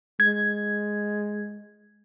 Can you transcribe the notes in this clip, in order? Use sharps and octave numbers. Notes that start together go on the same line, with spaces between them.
G#3 G#6